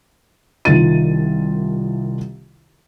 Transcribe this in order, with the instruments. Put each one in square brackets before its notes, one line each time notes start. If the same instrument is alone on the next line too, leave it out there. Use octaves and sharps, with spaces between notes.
[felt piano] C2 D#3 F4 A6 D#7